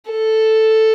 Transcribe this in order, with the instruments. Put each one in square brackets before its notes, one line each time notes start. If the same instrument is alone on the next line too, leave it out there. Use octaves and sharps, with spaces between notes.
[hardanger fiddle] A4